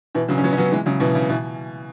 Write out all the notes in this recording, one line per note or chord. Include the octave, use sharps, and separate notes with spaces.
B2 E3
C#3 F#3
C#4
F#3 B3
C#4
F#3 B3
E3 G#3
C#3 F#3
B2 E3
C#3
B2 E3